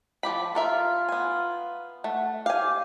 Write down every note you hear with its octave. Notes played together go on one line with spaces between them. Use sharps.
F3 G4 B5
F4 A4 A#4 E5
B3 G#5
A3 F#5
G4 F5 G#5